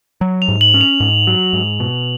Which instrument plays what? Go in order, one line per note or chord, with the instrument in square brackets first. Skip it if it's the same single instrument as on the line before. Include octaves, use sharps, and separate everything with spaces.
[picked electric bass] F#3
[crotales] F7
[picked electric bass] G#2
[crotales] F#7
[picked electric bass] C#4
[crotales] F7
[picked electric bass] G#2
F#3
G#2
B2